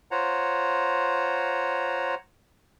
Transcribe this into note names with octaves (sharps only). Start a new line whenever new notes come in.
F4 C5 C#5 F#5 A#5